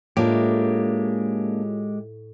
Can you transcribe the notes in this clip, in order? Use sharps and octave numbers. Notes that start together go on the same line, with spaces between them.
A2 G#3 A#3 D4 F4 G4 C#5